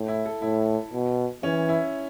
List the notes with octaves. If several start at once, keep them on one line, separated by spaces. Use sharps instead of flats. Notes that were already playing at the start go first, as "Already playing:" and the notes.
Already playing: A2
E4
A4
A2 E4
B2
E3 C#4
E4